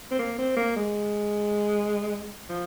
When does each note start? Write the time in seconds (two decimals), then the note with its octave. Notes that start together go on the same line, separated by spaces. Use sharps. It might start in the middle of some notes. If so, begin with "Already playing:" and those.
0.11 C4
0.19 A#3
0.38 C4
0.56 A#3
0.76 G#3
2.50 F3